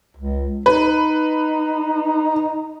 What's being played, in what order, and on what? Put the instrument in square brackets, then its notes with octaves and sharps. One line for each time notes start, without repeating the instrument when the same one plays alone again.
[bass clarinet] C#2
[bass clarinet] D#4 [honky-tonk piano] B4